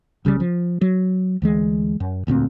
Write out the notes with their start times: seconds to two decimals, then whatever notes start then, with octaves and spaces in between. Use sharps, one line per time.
0.25 C2 C#3 F3 G3
0.40 F3
0.81 F#3
1.42 D2 E3 G#3
2.00 F#2
2.27 E1 D2 A#2 C4